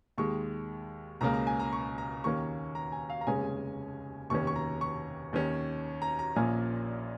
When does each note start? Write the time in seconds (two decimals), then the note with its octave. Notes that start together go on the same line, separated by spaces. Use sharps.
0.18 D#2 D#3 G#3 C#6
1.21 C#2 C#3 A#3 A#5
1.34 A#5
1.47 G#5
1.60 A#5
1.73 C#6
1.98 A#5
2.24 D#2 D#3 A#3 C#4 C#6
2.75 A#5
2.92 G#5
3.10 F5
3.21 A#5
3.27 F1 D#2 C#3 G#3 C#4 G#5
4.30 F1 D#2 D#3 C#4 C#6
4.47 C#6
4.56 A#5
4.81 C#6
5.33 D#2 D#3 C#4
6.02 A#5
6.19 A#5
6.36 A#1 A#2 F3 A#3 C#4 G#5